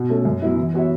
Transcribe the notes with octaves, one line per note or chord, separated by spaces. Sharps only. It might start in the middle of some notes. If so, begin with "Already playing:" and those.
Already playing: B2
A3 C#4 A4
F#2
F#3 B3 E4
E3
B3 F#4 C#5 E5